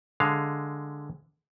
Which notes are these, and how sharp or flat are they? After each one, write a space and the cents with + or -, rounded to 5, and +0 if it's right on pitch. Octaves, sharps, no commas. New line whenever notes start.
D3 +0 G#3 +0 F5 +0